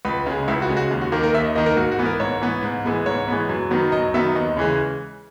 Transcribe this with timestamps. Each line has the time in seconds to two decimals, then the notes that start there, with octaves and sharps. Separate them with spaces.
0.05 C#2 B4
0.26 C#3 G#3
0.48 C#2 E4
0.62 F#4
0.69 C#3 G#3
0.77 F#4
0.91 D#2
1.01 F#4
1.12 D#3 A#3 A#4
1.23 A#4
1.34 D#2 E5
1.44 D#5
1.55 D#3 A#3 D#5
1.66 A#4
1.77 G#2 F#4
1.92 F#4
1.99 E3 B3
2.06 A#4
2.20 G#2 C#5
2.41 E3 B3
2.63 G#2
2.85 E3 G#3 B3
3.06 G#2 C#5
3.28 E3 G#3 B3
3.49 F#2
3.71 D#3 F#3 B3
3.92 F#2 D#5
4.14 D#3 F#3 B3 E5
4.35 D#2 D#5
4.56 C#3 E3 G#3